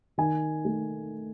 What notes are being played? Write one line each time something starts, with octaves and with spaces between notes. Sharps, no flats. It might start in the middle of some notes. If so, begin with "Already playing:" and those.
D#3 G#5
A3